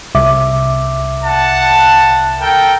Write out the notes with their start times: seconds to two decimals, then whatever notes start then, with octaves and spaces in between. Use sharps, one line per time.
0.15 C2 E5 D6
1.24 F#5 A5
2.41 A4 A#4 G5